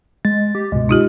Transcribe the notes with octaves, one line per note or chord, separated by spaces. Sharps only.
G#3 A6
G4
C#2 G2 B2 G#3
D#4 F4 G4